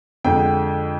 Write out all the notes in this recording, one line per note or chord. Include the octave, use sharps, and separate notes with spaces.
F2 D3 G#3 G5